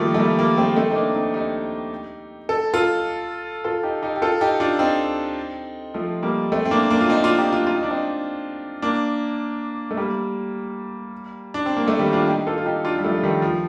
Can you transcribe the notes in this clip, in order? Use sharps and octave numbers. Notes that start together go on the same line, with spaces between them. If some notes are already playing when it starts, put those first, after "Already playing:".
Already playing: D#3 F3 G3 A3 A#3
A3
G3 A#3
G3 A#3
A3 C4
A3 C4
D#4
A#3 D4
C4 D#4
D#4 G4
A4
F4 A4
F4 A4
D#4 G4
D#4 G4
G4
F4 A4
D#4 G4
D4 F4
C4 D#4
F3 A3
G3 A#3
A3 C4
C4
A#3 D4
A#3 D4
F4
C4 D#4
D4 F4
D#4 G4
D4 F4
F4
D#4
D4
C4 D#4
A#3 D4
A3
G3 A#3
D4
C4
A#3
A3
D#3 G3
D4 F4
D#4 G4
F4 A4
F4
D#4 G4
D4 F4
G3
F3 A3
D#3 G3
F3